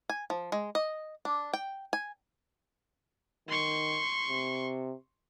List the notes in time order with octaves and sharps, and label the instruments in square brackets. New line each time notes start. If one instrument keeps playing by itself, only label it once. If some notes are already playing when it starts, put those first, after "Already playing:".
[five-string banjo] G#5
F3
G#3
D#5
D4
G5
G#5
[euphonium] D#3 [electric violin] C6 C#6
[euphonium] C3